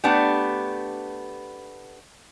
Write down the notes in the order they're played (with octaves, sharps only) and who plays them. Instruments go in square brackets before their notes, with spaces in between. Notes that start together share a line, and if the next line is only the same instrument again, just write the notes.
[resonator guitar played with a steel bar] A3 B3 D4 G4